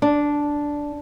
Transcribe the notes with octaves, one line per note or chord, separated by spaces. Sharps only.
D4